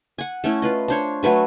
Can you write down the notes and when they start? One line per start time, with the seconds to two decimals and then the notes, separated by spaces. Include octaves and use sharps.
0.18 F#5 G#5
0.44 A3 C#4 E4
0.62 F4 B4 D#5
0.88 D4 C5 C#5
1.23 F#3 A3 B4 G#5